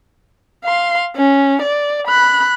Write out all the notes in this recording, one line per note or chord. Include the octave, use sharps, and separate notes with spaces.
F5 C6
C#4
D5
B5 F#6